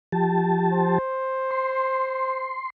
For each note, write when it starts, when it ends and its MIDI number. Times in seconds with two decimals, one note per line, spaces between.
0.12 0.98 53
0.12 0.98 67
0.12 0.98 81
0.73 2.58 72
1.51 2.70 84